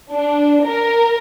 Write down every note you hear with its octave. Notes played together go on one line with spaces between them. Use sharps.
D4
A#4